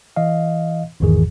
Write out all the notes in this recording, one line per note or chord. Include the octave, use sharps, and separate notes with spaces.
E3 D#5 F5
G#1 E2 G#2 D#3 E3 G#4